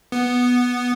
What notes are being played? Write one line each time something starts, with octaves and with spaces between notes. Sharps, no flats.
B3